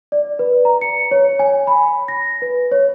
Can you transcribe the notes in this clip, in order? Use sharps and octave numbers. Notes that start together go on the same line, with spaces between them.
D5
B4
A#5
C#7
C#5
G#5
B5
A#6
B4
C#5